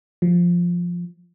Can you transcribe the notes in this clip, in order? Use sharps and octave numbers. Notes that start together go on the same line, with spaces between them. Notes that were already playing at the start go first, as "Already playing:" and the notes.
F3